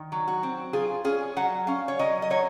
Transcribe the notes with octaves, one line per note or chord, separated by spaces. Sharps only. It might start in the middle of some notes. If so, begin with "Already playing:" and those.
Already playing: D#3
F#3
F#4
C4
F4 G#4
C#4 G#4
F#3 F#5
C#4 F5
C#5
F#3 D#5
D#5
F#3 C#5